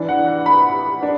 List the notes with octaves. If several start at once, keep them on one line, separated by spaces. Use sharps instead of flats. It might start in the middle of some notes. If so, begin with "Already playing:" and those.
Already playing: E3 D4
F#5
F#5
B5
D4